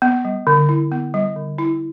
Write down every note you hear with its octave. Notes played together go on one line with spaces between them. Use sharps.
B3
G3
D3
E4
B3
G3
D3
E4